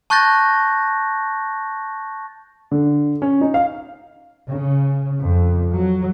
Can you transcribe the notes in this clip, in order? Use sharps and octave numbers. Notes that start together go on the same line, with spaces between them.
A5 C#6 F#6 G6 A6 A#6
D3
C#4
D#4
F5
C#3
F2
F#3